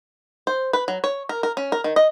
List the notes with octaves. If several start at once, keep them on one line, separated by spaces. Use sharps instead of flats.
C5
B4
F#3
C#5
A#4
A#4
C#4
A#4
D#3
D#5